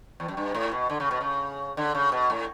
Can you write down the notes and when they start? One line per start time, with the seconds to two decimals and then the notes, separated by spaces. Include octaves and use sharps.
0.20 E2
0.28 F#2
0.37 G2
0.55 A2
0.71 B2
0.89 D3
1.00 C#3
1.11 B2
1.21 C#3
1.77 D3
1.95 C#3
2.12 B2
2.30 A2